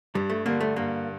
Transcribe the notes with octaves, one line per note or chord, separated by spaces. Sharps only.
G2 G3
A3
D3 G3 A#3
A3
G2 A#3